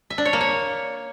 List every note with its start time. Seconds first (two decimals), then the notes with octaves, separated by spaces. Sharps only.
0.10 E5
0.18 D4
0.25 C#5
0.33 A#3
0.41 C#5